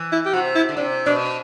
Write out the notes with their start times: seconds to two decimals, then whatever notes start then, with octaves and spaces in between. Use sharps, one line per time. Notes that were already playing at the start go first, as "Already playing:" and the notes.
Already playing: E3
0.12 E4
0.26 G4
0.34 C3 F#4
0.55 E4
0.69 D3
0.77 C3 D4
1.06 B2 D4